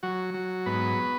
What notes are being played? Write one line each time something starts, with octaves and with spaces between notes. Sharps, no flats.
F#3 F#4
F#3
G#2 B3 B4